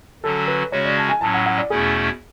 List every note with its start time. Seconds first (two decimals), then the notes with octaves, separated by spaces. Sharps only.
0.23 D3 F#3 C#4 F#4 A4
0.48 B4
0.72 C#3 G#3 C#4 F#4 C#5
0.85 D5
0.97 A5
1.09 G#5
1.21 A2 F#3 C#4 A5
1.34 F#5
1.46 F#5
1.58 D5
1.70 E2 B2 A3 C#4 E4 G#4